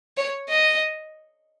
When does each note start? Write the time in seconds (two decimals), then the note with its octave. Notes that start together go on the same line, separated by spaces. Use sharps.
0.17 C#5
0.49 D#5